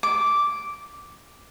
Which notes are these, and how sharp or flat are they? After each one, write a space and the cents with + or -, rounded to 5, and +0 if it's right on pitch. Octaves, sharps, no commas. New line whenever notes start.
D6 -5